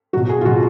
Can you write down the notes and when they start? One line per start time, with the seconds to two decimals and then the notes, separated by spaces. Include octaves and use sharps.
0.13 F#3 F#4
0.16 B2
0.29 G#4
0.41 F4
0.45 B2 F#3 F#4